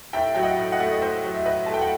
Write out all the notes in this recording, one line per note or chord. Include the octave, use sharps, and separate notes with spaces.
A2 E5 G5
F#3 G5
D#5 F#5
A2
D#5 F#5
A3
D#5
A2 C5 E5
F#3
E5
A2 B4 D#5
A3 A5
G5
F#5